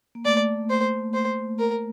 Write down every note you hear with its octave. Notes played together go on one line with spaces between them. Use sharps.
A#3
A3 D5
C5
C5
A#4